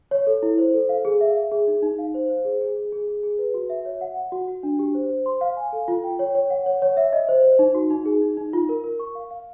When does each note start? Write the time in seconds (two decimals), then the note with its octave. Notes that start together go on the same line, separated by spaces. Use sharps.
0.11 C#5
0.27 A4
0.43 E4
0.58 C5
0.74 A4
0.89 F5
1.05 G#4
1.21 E5
1.36 E5
1.52 G#4
1.67 D#4
1.82 D#4
1.98 F5
2.14 C5
2.30 C5
2.45 G#4
2.61 G#4
2.76 G#4
2.92 G#4
3.08 G#4
3.23 G#4
3.39 B4
3.54 F#4
3.70 E5
3.85 C#5
4.01 F#5
4.17 F#5
4.32 F#4
4.48 F#4
4.63 D4
4.79 G4
4.94 C5
5.09 C5
5.26 C6
5.41 F5
5.57 G#5
5.73 A4
5.88 F4
6.04 G5
6.19 C#5
6.35 C#5
6.50 F#5
6.66 C#5
6.82 C#5
6.97 E5
7.13 D#5
7.29 C5
7.44 C5
7.59 D#4
7.75 F#4
7.91 D#4
8.06 G#4
8.22 D#4
8.37 D#4
8.53 F4
8.69 A#4
8.84 A#4
9.00 C#6
9.15 F5
9.31 F5